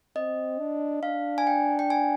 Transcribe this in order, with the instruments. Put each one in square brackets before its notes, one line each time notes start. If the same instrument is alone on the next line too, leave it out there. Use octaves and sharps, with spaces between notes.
[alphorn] C4 [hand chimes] D#5
[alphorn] D4
[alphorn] D4 [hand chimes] F5
[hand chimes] G#5
G5
G5
G#5